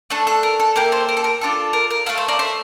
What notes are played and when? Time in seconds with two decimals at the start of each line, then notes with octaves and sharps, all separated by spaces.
0.10 A3 D4 A4
0.27 A4
0.43 A#4
0.60 A4
0.76 A#3 E4 G4 A#4
0.92 A4 C5
1.08 A#4
1.17 A4
1.24 A#4
1.41 D4 F4 A4
1.73 A#4
1.90 A#4
2.06 A3 D4 F4 A4 A#4
2.17 A4 C5
2.28 A#4 D5
2.39 C5 E5